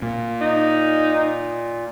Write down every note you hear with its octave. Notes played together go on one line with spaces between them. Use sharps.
A#2
D#4